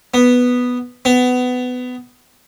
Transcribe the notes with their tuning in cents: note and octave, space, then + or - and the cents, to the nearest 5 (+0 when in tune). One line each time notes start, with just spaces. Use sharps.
B3 +0
B3 +20